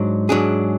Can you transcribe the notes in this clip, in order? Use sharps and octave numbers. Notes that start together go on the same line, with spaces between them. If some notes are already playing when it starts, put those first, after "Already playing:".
Already playing: G#2 F#3 D4
G#2 F#3 D4 G#4